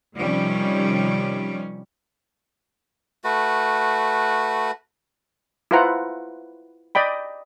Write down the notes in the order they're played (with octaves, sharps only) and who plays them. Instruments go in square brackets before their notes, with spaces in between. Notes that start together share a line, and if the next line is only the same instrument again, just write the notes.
[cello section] C3 D#3 F3 G3 C#4
[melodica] A3 F#4 B4
[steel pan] E4 F4 B4 C5 F#5 A#5
D5 D#5 G5 B5